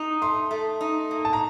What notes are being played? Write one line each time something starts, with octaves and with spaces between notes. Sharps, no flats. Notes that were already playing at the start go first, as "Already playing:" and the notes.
Already playing: D#4
A3 C6
A3
D#4
A#3
A5
A#5